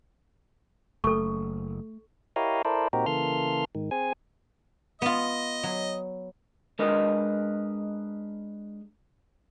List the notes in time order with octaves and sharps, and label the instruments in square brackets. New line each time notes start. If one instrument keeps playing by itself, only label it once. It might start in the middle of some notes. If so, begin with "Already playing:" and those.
[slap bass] F#1 [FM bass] A3 [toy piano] A4 C#6
[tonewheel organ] E4 G4 A#4 C#5 D#5 F5
E4 A4 A#4 C5 D5
A#2 C4 D#4 F#4 G4 A#4
C#3 E3 A#3 A4 C6 F6
G#2 D#3
C4 G#4 G#5
[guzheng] B3 F4 [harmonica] D#5
[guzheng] F#3
[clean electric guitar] G#3 D4 A#4 B4 D#5